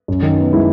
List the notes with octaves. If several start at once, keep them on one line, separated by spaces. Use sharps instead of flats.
F#2
D#3
B3
G#3 E4